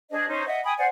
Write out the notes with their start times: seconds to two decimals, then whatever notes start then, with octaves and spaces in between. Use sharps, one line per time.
0.11 D4 G#4 C5 D#5
0.28 C#4 D#4 C5
0.46 D#5 E5 F#5
0.64 G5 G#5 B5 D#6
0.78 C5 D5 F#5 G#5